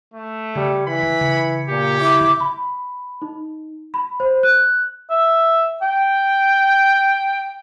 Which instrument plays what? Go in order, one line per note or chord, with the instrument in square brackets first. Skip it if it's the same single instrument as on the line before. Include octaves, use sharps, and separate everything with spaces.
[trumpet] A3
[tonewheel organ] C#3 [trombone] G3
[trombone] E3 [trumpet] B5
[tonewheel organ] C#3
[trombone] A#2 [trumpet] G4
[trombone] E4 [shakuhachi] D6
[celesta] B5
D#4
B5
C5
F#6
[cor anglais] E5
G5